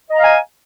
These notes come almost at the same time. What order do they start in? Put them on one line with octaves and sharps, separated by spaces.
D#5 A#5 F5 G#5